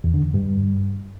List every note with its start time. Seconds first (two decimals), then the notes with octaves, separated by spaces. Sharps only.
0.04 E2
0.14 D3
0.24 E2
0.34 G2